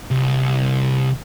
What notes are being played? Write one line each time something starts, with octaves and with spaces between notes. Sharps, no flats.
C2